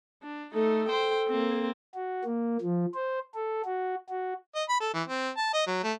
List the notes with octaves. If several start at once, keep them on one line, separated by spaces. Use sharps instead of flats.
D4
A3 D#4 A4
C5 G5
A#3 C4
F#4
A#3
F3
C5
A4
F#4
F#4
D#5
B5
A4
E3
C4
A5
D#5
F#3
A3